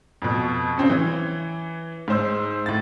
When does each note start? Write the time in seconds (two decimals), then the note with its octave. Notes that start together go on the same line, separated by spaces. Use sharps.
0.22 F2 B2
0.78 C#3 C4 C#4
0.90 E3 C#5
2.08 G#2 C5 E6
2.66 A2 A6